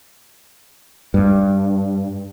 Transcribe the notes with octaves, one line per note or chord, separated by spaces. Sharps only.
G2